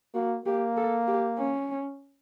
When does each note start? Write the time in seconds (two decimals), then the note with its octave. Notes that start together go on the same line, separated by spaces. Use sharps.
0.15 A#3 F#4
0.46 A#3 G4
0.77 A4
1.08 G4
1.39 C#4